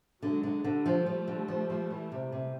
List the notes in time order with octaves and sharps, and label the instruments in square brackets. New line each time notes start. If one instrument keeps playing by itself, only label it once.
[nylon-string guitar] D3 [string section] F#3 G#3
[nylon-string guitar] D3
[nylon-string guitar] D3 [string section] G3 A3
[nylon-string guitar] F3
F3
D3
F3
F3
E3
C3
C3